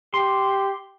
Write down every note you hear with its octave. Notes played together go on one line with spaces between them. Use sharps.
G4 C6